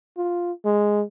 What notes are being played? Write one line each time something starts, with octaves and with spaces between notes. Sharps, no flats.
F4
G#3